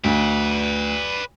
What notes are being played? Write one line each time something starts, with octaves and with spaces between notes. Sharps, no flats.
D2 B4 D5